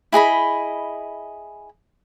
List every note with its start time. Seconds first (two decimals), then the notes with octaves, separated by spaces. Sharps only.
0.12 E4 G#4 D#5 B5